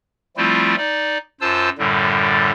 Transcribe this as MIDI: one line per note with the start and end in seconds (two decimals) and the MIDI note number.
0.37 0.76 53
0.37 0.76 55
0.37 0.76 57
0.37 0.76 60
0.37 0.76 64
0.37 0.76 65
0.78 1.18 63
0.78 1.18 74
1.41 1.69 42
1.41 1.69 65
1.41 1.69 72
1.41 1.69 81
1.41 1.69 88
1.78 2.51 42
1.78 2.51 45
1.78 2.51 50
1.78 2.51 55